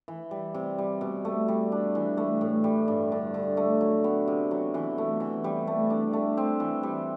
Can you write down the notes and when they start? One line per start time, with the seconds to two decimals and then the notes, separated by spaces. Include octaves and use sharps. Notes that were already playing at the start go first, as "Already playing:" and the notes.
0.08 E3
0.31 G3
0.54 C3
0.79 G3
1.01 B2
1.25 A3
1.48 G3
1.72 D4
1.95 E3
2.17 A3
2.41 A2
2.64 G3
2.88 G2
3.12 D3
3.34 D3
3.57 A3
3.81 F#3
4.04 B3
4.28 C3
4.51 F#3
4.74 E3
4.98 A3
5.20 E3
5.44 G3
5.67 A3
5.90 D4
6.13 A3
6.37 C4
6.60 E3
6.83 G3